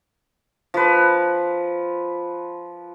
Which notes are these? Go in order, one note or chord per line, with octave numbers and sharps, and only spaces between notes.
F3 B4